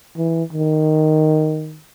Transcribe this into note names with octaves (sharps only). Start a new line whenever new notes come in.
E3
D#3